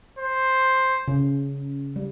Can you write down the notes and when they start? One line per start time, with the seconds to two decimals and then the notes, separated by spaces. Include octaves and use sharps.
0.19 C5
1.08 C#3
1.96 G3